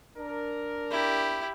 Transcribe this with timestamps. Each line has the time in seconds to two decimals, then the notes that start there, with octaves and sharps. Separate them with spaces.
0.18 D4 A#4
0.91 E4 G4